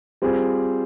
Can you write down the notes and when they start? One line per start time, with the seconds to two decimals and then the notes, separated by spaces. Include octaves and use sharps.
0.22 G3 C4 F4 G#4 C5